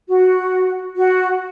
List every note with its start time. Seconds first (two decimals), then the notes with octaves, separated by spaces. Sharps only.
0.09 F#4
0.96 F#4